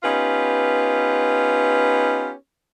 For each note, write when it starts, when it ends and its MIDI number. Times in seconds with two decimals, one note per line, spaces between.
0.03 2.32 59
0.03 2.32 61
0.03 2.32 63
0.03 2.32 65
0.03 2.32 67
0.03 2.32 71